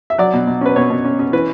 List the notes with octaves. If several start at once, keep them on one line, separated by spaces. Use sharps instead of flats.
E5
F#3 D5
B2
B2
C#4 B4
B2 C#5
B2
C#4
C#4
E3 B4